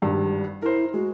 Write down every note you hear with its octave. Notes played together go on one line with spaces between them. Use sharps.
G#1 G2 G3
E4 A#4 C5
G#3 F#4